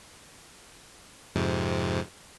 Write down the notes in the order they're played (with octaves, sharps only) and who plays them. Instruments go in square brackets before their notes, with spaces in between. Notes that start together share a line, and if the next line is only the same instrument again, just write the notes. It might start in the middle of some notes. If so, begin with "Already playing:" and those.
[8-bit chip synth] F2 G#2 C3